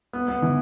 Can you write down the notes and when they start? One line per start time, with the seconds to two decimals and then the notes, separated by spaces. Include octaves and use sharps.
0.13 B3
0.28 B3
0.42 E3